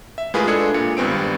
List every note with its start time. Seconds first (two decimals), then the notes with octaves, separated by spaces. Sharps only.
0.18 E5
0.34 A2 G#3 F4 G#4 A#4 B4
0.47 G#3 D4 G#4 A4 G#6 C#7
0.74 A#2 C#7
0.97 G#1 G2 B3 C4 D7